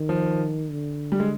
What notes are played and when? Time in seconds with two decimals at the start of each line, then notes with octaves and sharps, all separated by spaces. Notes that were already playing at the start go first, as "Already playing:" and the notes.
Already playing: D#3
0.09 F3
0.71 D3
1.12 G3
1.20 G#3